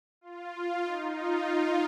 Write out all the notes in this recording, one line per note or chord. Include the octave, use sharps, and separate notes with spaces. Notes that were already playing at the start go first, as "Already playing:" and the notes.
F4
D#4
F4